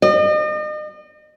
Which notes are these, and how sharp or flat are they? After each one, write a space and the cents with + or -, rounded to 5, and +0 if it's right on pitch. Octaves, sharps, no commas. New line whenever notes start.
D#5 -40